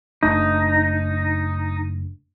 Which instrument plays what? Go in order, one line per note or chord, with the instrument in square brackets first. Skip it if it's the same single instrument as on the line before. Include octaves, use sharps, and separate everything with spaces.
[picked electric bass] F#1 A3 D4 [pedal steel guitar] D#4